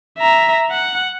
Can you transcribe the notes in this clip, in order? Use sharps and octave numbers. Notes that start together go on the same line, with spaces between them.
E5 A#5
F#5